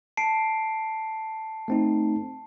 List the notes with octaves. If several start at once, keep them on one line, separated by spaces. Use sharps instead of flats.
A5 C7 D7
A3 C4 D#4